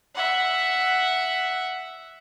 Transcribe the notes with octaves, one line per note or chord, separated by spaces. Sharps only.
E5 F#5